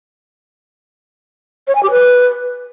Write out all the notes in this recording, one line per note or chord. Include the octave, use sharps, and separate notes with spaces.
C#5
G#5
G4
B4